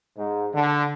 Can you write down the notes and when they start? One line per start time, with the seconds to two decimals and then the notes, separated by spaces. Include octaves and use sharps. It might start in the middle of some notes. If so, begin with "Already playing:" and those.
0.18 G#2
0.55 D3